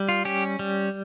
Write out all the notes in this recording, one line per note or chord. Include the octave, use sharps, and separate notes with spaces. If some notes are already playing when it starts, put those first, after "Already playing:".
Already playing: G3
F4
C#4 G4
G3